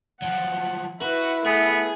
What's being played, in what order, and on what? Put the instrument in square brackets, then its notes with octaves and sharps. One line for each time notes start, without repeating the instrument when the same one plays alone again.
[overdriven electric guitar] F3 F#3 [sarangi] F#5
[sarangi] E4 [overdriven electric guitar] F#4 [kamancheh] B4
[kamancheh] A3 [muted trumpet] B3 [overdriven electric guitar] G#4